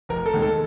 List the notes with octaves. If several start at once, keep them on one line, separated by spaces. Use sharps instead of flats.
F1 A#4
A4
D#2 D#3 G#3
A4